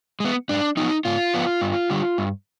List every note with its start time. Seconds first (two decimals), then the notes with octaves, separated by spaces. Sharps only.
0.20 G#3 B3
0.49 G#2 D4
0.77 F3 B3 D#4
1.05 G#2 F4
1.34 F3 B3
1.61 G2
1.90 D3 G3
2.18 G2